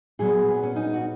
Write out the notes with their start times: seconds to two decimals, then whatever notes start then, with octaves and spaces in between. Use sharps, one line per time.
0.19 A#2 F#3 B3 G#4
0.63 C#4
0.76 D#4
0.94 F#4